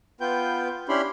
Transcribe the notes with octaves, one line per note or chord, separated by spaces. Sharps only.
B3 F4 B4 G5 G6
C#4 D4 E4 G4 B5 C6